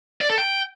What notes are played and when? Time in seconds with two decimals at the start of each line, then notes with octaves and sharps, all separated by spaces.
0.21 D5
0.29 A4
0.38 G5